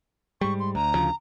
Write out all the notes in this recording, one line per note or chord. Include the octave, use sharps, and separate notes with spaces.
G#2 G3 C#6
C6
D2 A#5
D2 C#3 F3